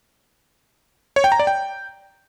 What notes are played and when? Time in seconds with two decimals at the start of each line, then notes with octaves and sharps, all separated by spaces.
1.16 C#5
1.24 G5
1.32 A#5
1.39 D5
1.47 G5